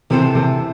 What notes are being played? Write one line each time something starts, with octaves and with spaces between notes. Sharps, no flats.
C3 E3 C4 A4 C5
C3